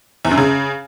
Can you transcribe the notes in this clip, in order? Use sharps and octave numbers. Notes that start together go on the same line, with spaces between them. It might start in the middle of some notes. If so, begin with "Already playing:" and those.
E2
F#2
C#3